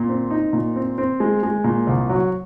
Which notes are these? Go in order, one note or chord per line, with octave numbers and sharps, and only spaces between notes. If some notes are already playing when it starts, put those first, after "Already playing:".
Already playing: A#2
C4
D#4
A#2
C4
C4
G#3
G#3
A#2
C2
F#3